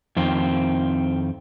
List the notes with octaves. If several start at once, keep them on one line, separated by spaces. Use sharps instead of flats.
F2 D#3 C4